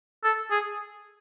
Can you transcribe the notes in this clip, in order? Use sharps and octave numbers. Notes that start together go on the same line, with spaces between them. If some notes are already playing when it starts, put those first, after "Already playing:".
A4
G#4